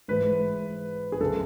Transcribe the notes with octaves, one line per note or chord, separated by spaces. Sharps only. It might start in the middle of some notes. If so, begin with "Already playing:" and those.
G#2 E3 G#3 B4
G#4
F#2 C#3 F#3 A4